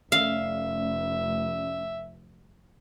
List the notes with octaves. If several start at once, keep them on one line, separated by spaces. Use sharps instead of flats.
F1 A3 C#4 D5 E5 F5